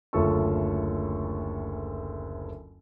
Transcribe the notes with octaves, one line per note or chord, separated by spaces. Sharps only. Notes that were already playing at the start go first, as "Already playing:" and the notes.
F#1 D2 C#4 F4 A4 C#6